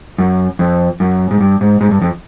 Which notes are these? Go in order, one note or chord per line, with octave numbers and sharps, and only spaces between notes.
F#2
F2
F#2
G#2
G2
G#2
G#2
G2
F2